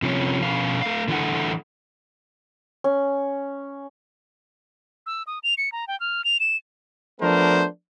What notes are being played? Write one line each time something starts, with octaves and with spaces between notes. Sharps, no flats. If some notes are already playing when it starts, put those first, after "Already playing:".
C3 F3 C#4
B2 F3 C#4 F5
A3 F5
D3 E3 A3 E4 A4 F#5
C#4
E6
D#6
F7
C#7
A#5
G5
F6
F7
E7
F3 A3 B3 D4 A#4 C5